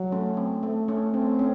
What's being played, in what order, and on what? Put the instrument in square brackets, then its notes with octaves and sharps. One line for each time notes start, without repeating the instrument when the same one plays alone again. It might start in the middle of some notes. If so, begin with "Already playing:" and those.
Already playing: [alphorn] F#3
[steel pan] A3 C#4
C4
A3
A3 C#4
[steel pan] A3 C#4 [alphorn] C4
[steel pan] A3 C#4